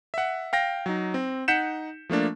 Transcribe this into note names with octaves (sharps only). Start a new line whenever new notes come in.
E5 F#5
F5 G5 A#6
F#3 D#4
C4
D#4 F#5 G6 B6 C#7 E7
F3 A3 A#3 D4